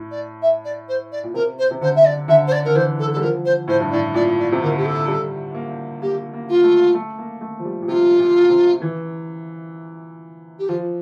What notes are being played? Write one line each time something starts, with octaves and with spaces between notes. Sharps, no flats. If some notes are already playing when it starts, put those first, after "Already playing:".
Already playing: A2
D5
E5
D5
C5
D5
A#2
C3 A#4
C5
C3
D3 C5
E5
D5
D3 E5
C5
D5
D3 A#4
E3 C5
A4
G3 A4
F3 A#4
C5
A2 C5
G2
A2 D5
A#2 D5
D5
C3
D3 A#4
G4
A4
G3
A#3
A#3 G4
A#3
F4
A3
A3
A#3
A3
F3
G3
A#2
C3 F4
A#2
A#2
C3
E3
G4
F3 F4